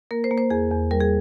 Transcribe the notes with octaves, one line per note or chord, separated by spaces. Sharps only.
A#3 A#4
C5
A#3
C5
E2 G#4
E2
G3 A#4
G#4